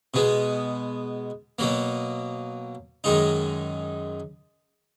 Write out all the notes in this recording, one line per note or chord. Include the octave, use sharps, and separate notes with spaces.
B2 G#3 B3
B2 F#3 A#3
F#2 D#3 G#3 D#4